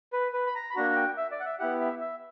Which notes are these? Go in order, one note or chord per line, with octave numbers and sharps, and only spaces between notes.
B4
B4
B5
A#5
B5
A#3 D4 F#4 A#5
A#5
G5
E5
D5
F#5
E5
B3 E4 G4 F#5
E5
E5